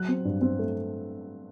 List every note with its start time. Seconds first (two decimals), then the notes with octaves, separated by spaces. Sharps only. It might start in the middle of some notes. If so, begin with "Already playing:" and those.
Already playing: F#3 F#6
0.08 C4
0.25 G2
0.41 C4
0.59 A3